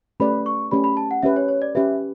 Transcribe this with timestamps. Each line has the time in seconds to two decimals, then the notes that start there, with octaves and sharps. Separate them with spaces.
0.20 A3 C#4 G4 B4 D5 B5
0.46 C#6
0.71 A3 C#4 G4 B4 D5 B5
0.84 B5
0.97 A5
1.11 F#5
1.23 C#4 G4 B4 E5
1.36 C#5
1.48 C#5
1.62 D5
1.75 C#4 G4 B4 E5